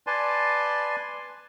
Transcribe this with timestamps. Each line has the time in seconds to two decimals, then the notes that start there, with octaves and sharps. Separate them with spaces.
0.07 B4 D5 G#5 A5 C6